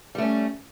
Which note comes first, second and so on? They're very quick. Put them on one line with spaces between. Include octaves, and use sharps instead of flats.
G3 A3 C#4